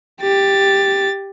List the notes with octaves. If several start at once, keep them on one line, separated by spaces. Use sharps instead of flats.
G4 A6